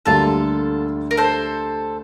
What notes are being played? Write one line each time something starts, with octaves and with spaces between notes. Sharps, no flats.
D2 D3 G3 A#3 F4 A4
A#4
A4 C5